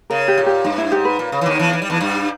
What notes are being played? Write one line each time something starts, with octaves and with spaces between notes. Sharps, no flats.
C#3 A#4
G4
A#2
G4
G2 D#4
E4
G#2 G4
B4
A#2
C#3
E3
D#2 D#3
E2 E3
E3
G3
E2 E3
G2 G3